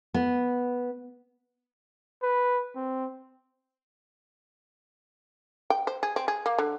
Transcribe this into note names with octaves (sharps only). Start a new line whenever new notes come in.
B3
B4
C4
G5
C5
G#4
C4
G#4
A#3
D3